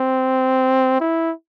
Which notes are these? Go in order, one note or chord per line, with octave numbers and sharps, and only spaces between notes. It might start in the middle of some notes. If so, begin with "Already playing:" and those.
Already playing: C4
E4